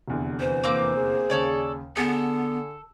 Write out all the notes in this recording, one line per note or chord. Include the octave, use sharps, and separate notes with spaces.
F1 E2 D3
E3 C5
E3 A#3 C4 D6
G#4
D#2 C#3 A4 C#5 D5
D3 B3 G#4 A4